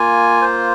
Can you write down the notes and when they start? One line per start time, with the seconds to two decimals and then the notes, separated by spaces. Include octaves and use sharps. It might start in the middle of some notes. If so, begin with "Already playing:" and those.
Already playing: A#3 F4 G#5
0.41 C5